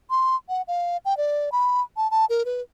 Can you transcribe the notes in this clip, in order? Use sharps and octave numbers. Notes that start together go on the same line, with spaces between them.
C6
F#5
F5
G5
D5
B5
A5
A5
A#4
B4